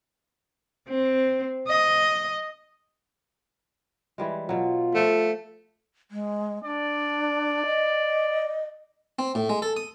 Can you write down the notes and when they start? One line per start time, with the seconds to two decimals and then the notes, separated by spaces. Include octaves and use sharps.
0.89 C4
1.68 D#5
4.18 E3 G3 G#3
4.49 B2 F#3 F4
4.95 F3 A3
6.11 G#3
6.64 D4 D5
7.66 D#5
9.19 C4
9.35 A2
9.49 G#3
9.62 A4
9.77 D#6